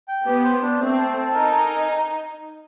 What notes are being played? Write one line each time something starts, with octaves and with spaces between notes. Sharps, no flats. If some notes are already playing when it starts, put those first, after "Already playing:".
G5
B3 G4
C5
D4
A3 C4
A4
A4
D#4 A#4
G#5